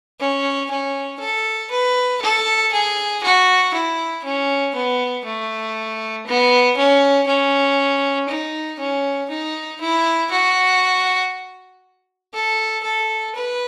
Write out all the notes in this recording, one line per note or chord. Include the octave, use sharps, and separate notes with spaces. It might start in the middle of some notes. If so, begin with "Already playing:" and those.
C#4
C#4
A4
B4
A4
G#4
F#4
E4
C#4
B3
A3
B3
C#4
C#4
D#4
C#4
D#4
E4
F#4
A4
A4
B4